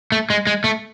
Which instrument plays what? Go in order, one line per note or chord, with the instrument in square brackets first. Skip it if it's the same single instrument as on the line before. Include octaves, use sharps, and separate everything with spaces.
[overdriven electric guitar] A3
G#3
G#3
A3